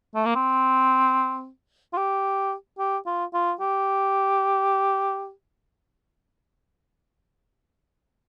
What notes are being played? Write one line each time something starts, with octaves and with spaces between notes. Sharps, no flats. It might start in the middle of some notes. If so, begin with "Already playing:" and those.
A3
A#3
C4
F4
G4
G4
F4
F4
G4